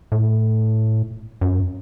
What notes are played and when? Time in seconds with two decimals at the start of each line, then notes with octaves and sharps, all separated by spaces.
0.12 A2
1.41 F#2